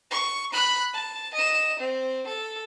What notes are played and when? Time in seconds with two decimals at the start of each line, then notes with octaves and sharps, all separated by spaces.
0.11 C#6
0.53 B5 F#6
0.94 A5
1.34 D#5 E7
1.79 C4
2.27 A4